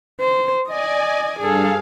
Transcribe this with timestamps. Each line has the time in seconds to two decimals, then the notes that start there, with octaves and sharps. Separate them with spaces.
0.20 C5
0.68 D5 D#5 G#5
1.39 G2 G#4 A4 F5